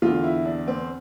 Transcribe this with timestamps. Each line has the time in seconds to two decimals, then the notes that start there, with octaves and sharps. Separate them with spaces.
0.02 E2 D3 F4
0.23 E4
0.45 D4
0.68 C4